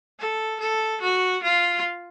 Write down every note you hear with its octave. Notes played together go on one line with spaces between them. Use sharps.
A4
A4
F#4
F4